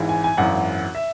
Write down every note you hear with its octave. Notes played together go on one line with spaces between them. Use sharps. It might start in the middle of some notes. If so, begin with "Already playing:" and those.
Already playing: G#1 G#2 E3
G#5
G#5
G#1 F#2 E3 F#5
E5